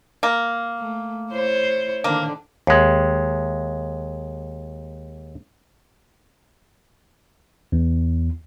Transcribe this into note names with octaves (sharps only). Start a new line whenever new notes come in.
A#3
A3
E4 C5 C#5
D3 D#3 A#3 D4
D#2 G#3
E2